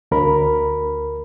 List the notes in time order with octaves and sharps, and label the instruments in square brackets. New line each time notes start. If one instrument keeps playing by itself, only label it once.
[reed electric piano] D2 A#4 B5